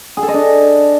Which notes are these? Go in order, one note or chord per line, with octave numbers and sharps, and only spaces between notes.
G#4
A4
D#5
D4